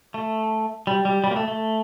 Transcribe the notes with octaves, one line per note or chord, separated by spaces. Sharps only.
A3
G3
G3
G3
A#3
A3
A3